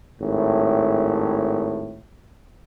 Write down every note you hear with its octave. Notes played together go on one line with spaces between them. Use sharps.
G#1 A2